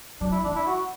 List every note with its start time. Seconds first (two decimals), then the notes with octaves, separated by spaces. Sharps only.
0.21 F#3 D4
0.32 E4
0.44 E3 D4
0.56 E4
0.67 F#4